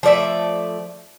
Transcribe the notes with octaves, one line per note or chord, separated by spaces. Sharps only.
F3 A3 D5 E5